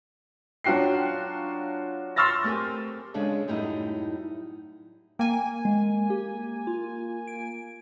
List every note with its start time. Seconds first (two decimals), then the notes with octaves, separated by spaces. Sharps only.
0.64 F#3 D4 F4 F#4 G5 C7
2.16 C6 C#6 E6 F6 A6 A#6
2.44 A3 C4 G4 A#4 G#5
3.14 C#3 G#3 D4 G#4 A4
3.48 F#2 A2 G3 D#4 E4 D#5
5.19 A#3 G5 G#5
5.65 G#3
6.10 G4
6.67 F4
7.28 D7